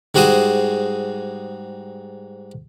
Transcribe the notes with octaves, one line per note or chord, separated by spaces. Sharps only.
G#2 G3 F#4 G#4 C5 D#6